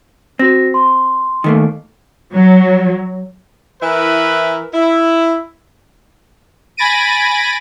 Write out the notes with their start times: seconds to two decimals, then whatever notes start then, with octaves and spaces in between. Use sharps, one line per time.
0.39 C4 F#4 A#6
0.74 C6
1.44 D#3 A3 A#3
2.34 F#3
3.82 E3 E4 A#4 B4
4.73 E4
6.77 G#5 B5 A6 A#6 D7 D#7